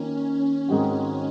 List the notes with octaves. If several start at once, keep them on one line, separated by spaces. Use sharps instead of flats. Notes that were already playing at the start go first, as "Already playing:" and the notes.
Already playing: D#3 A#3 C#4 F4
G#2 D#3 G#3 C4 F#4